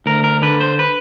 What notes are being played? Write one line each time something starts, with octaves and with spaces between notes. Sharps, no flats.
D2 A#4
A#4
D3 B4
C5
B4